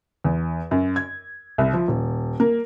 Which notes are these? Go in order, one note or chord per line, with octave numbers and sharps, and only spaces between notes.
E2
F#2
G#6
C2
F3
D#1
A#3